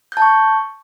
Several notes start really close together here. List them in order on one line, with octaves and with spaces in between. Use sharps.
G6 A5 C#6